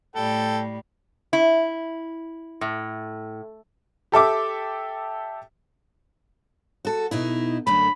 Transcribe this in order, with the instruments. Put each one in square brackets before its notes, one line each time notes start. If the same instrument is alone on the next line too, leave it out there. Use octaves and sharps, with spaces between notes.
[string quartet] A2 G3 [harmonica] A4 G5
[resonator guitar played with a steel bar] E4
A2
[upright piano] G4 A4 E5 D6
[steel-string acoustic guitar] F#4 A4
B2 D#4 E4
[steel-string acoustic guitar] F#2 D3 A3 [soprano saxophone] B5